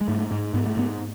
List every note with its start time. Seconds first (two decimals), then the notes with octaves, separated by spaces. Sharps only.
0.01 G#3
0.08 G#2 A3
0.31 G#2
0.54 G#2 B3
0.66 A3
0.77 G#2 B3